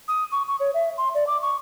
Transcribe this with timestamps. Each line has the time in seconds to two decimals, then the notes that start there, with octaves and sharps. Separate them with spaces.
0.08 D#6
0.32 C#6
0.48 C#6
0.60 C#5
0.74 E5
0.98 C6
1.15 D5
1.27 D6
1.42 C#6